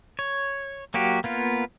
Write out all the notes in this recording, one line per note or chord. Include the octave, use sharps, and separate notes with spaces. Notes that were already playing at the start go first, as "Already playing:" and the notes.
C#5
F#3 A#3 F#4 G4
A#3 B3 F4